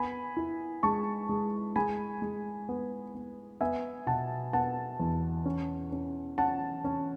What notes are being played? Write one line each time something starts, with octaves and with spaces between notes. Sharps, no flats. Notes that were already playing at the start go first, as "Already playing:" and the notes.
Already playing: B3 G#5 B5
E4
G#3 A5 C#6
G#3
G#3 G#5 B5
G#3
B3
B3
B3 E5 G#5
B2 F#5 A5
B3 F#5 A5
E2
C#4
C#4
C#4 F#5 A5
C#4